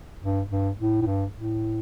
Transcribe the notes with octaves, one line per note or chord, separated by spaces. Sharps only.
G2
G2
A2
A2
G2
A2